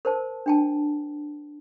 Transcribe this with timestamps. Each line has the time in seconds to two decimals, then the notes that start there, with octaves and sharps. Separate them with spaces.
0.05 A#4 C5 A5
0.46 D4 G5 A5